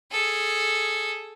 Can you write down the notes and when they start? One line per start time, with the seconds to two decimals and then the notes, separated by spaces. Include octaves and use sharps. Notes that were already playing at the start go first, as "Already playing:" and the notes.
0.11 G#4 A4